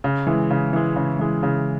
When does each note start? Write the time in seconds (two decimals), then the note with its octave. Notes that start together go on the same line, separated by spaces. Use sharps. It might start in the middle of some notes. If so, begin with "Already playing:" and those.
0.04 C#3
0.27 E3 G#3
0.50 C#3
0.73 E3 G#3
0.96 C#3
1.19 E3 G#3
1.43 C#3